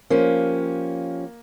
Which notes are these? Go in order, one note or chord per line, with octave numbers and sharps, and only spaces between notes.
F3 A#3 C#4 G4